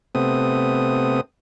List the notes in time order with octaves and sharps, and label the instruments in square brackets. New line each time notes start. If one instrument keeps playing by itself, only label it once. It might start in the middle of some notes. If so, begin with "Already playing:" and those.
[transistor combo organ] C3 A3 B3 C4 D#6